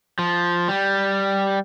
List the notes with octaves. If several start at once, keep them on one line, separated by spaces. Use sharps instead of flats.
F3
G3